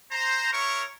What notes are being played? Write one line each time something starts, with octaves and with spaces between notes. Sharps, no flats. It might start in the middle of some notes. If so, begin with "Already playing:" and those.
C5 A#5
E4 A#4 C#5 C#6